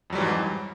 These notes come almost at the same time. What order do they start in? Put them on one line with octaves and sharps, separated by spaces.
F2 F#3 G3 E3 G#2